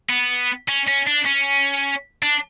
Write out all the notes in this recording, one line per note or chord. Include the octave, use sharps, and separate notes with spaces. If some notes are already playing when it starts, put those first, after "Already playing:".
B3
C#4
C#4
D4
C#4
D4